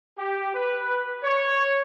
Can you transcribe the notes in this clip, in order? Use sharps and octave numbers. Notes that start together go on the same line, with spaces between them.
G4
B4
C#5